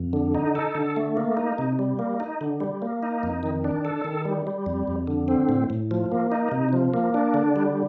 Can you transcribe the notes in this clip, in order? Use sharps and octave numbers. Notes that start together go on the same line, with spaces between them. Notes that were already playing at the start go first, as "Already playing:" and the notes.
Already playing: F2
D3
D#4
A4
D3
A3
A#3
D#4
C3
G3
A#3
D#4
D3
G3
A#3
D#4
F2
D#3
D4
A4
D#3
G3
G3
F2
F2
D3
C4
A2
A2
F3
A#3
D#4
C3
F3
A#3
D4
D3
G3